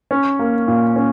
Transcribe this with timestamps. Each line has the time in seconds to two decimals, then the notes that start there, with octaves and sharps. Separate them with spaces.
0.11 C#4
0.39 A#3
0.68 A#2
0.96 C#4